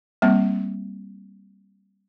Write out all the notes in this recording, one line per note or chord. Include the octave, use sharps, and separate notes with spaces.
G3 A#3 C4